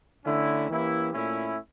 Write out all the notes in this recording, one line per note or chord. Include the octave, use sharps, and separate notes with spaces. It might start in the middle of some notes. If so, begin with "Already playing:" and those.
D3 A3 C#4 E4
E3 A#3 C#4 E4 G4
A#2 A3 C#4 E4